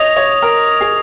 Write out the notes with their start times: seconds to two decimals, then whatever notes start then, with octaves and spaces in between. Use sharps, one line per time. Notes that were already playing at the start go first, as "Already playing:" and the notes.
Already playing: C#5 D#5 D#6 A#6 F7
0.17 C#5
0.42 A#4
0.81 G#4